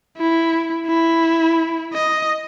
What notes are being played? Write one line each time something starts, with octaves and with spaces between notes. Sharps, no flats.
E4
E4
D#5